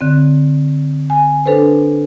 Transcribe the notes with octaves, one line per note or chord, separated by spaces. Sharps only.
D3 C4
G#5
D4 A4 B4 C5